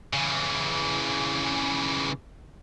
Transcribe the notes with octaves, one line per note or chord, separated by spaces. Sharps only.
C#3 E3